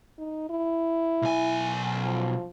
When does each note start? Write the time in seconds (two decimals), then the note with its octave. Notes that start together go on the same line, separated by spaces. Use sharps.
0.18 D#4
0.49 E4
1.22 B1 G#5
2.02 F3